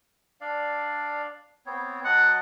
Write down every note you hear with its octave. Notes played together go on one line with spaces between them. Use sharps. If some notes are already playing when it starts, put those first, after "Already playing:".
D4 D5 F5
B3 C4 C#5
F#3 D#5 F#5 A5